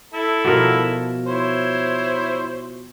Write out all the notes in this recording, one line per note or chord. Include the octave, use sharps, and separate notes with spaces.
E4 A4
B2 F3 A#4
E4 C5 C#5